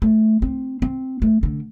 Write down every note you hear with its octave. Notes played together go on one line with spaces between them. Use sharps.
A3
C4
C4
A3
D3